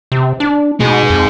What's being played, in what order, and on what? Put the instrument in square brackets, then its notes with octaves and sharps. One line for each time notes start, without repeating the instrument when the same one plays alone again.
[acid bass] C3
D4
[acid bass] B2 [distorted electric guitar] D#4 G#4
[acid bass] F2